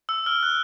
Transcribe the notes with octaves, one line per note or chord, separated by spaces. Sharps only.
E6
F6
F#6